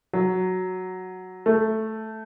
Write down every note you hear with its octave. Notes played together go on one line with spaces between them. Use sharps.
F#3
A3